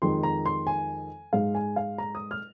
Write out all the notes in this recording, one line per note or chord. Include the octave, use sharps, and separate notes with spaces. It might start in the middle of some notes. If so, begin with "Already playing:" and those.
F2 D#3 G#3 C6
A#5
C6
G#5
G#2 G#3 F5
G#5
F5
A#5
D#6
F6